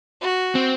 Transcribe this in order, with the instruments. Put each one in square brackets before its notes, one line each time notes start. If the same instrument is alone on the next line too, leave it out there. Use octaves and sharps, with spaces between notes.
[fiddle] F#4
[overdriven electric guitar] C4